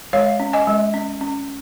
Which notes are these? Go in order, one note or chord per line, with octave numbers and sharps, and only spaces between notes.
G#3 C#5 F5
C#4
D#5 G#5
G#3
C#4
C#4